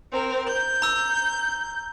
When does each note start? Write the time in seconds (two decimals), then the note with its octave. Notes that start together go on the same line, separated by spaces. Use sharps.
0.12 C4 A#4
0.49 G6
0.82 A#5 E6